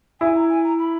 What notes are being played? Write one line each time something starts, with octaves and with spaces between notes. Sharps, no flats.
E4 G#5
A#5
G#5
A#5
B5